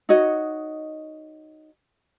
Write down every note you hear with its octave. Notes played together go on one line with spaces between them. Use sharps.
D#4 F#4 C#5 D#5